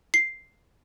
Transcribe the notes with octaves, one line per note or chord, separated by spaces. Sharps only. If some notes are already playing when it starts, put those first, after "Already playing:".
C7